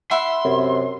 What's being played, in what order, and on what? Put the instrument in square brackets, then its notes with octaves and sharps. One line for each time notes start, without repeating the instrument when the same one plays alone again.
[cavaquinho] E4 E5 F#5 [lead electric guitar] C6
[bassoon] F#2 [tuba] C3